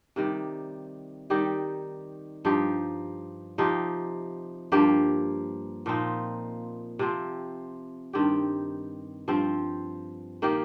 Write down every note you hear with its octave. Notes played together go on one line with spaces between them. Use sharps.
C3 D#3 G3
D#3 G3 D#4 G4
G2 F3 D#4 G4
C3 F3 D#4 G4
G2 F3 A#3 G4
A#2 F3 C4 D#4
C3 F3 C4
G2 D#3 C4 G4
G2 F3 C4
D#3 A#3 G4